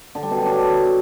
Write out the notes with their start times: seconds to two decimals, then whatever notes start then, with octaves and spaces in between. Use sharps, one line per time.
0.15 D3
0.23 G3
0.30 B2
0.38 F#3
0.46 D4